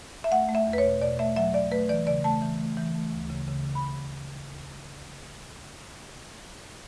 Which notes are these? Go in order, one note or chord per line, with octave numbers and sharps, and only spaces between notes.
E5
A3 F#5
A3
E5
E2
B4
C#5
B2
B2 D5
A3 E5
F#3 E5
B2 D5
A3 B4
E3 D5
C#3 D5
A3 A5
E3
A3
E3
A3
D2
C#3
C#3
C#3
B5